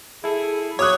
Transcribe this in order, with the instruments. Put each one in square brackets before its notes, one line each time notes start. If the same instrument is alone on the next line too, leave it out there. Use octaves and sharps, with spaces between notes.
[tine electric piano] E4 A4 [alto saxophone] G#4
[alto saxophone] F#3 [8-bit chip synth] C#5 [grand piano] D6 D#6 F#6